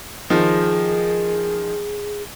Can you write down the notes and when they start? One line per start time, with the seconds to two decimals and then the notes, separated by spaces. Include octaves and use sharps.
0.30 D#3 F3 G#4